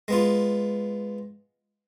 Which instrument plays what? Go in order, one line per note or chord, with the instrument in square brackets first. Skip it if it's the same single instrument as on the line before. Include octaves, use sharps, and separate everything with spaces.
[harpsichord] G#3 B3 F4